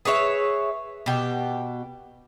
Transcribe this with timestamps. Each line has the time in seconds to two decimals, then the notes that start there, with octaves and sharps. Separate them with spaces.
0.05 G#4 B4 C#5 E5
1.06 B2 G4